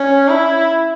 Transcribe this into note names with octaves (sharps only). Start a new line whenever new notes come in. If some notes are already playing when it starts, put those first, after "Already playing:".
Already playing: C#4
E4